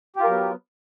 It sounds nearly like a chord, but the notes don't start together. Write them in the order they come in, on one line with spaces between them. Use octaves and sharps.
G4 F4 A#4 F#3 B3